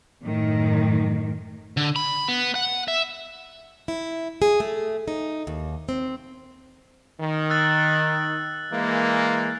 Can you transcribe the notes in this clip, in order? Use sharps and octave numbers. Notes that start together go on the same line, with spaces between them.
F#2 A2 D#3
D3
B5
B3
F#5
E5
E4
G#4
A3
D#4
D#2
C4
D#3
E6 F#6 A6
E3 G#3 A#3